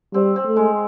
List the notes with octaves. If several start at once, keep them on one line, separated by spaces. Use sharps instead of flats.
G3 C4
C4
A3
G#3